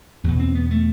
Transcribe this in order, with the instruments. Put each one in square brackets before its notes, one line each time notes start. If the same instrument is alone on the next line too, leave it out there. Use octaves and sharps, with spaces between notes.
[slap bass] E2 B2 B3
C4
B3
A3